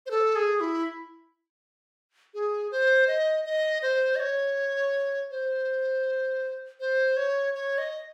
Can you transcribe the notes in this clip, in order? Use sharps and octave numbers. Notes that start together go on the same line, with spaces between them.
C5
A4
G#4
E4
G#4
C5
D#5
D#5
C5
D#5
C#5
C5
C5
C#5
C#5
D#5